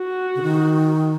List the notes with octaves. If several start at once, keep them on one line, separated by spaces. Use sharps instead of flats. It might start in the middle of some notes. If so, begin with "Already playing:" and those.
Already playing: F#4
C#3
D#3